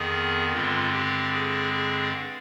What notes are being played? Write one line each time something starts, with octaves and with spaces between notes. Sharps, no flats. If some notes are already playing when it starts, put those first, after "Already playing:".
Already playing: F2 D#3 B3 G#4
G2 D3 G#3 C4 F4
G4
G#4
G#4